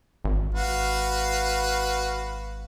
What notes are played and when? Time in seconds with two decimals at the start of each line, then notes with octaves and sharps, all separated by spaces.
0.25 G#1
0.54 F#4 B4 F5